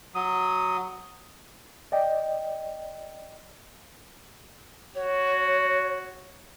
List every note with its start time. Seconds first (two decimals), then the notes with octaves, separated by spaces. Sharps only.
0.15 F#3 D#6
1.92 D5 D#5 G5
4.95 F#4 C#5